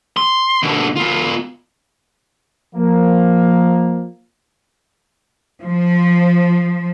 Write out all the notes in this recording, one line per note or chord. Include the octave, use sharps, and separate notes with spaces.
C6
B2 D3
B3 F4
F3 A#3
F3